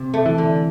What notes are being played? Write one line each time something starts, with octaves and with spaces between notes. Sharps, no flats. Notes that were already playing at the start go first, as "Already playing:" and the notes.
Already playing: C3
A3
E3
D3